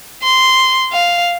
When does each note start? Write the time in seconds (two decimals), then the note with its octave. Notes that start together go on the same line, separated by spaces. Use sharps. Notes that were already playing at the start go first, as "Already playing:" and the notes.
0.23 C6
0.92 F5